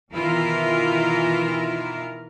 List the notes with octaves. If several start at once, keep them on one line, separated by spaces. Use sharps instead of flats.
B2 D#3 E3 E4 F4 A#4